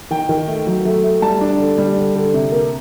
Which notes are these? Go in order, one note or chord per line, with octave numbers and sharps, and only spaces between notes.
D#3 G5
D#3
A3
F#3
A3
A3
G3 A5
D4
D3
G3
D3
D3
C3
A#3